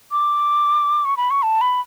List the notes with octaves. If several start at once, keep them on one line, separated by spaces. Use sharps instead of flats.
D6
C#6
B5
C#6
A5
B5